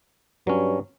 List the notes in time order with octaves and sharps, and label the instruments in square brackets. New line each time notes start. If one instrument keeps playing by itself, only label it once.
[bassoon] G2 [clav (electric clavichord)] F#3 C#4